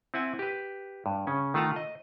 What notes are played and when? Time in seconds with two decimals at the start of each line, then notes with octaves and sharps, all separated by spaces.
0.14 C4 E4 F#5 G#5
0.39 G4 B4
1.06 G2
1.27 C#3 C#4
1.54 D#3 A3 F4 F#5 A5 A#5
1.76 D#5